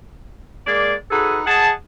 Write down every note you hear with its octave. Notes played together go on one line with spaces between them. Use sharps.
G#3 A#3 D5
D#4 F#4 G#4 A4 B4
G#4 D#5 F#5 A5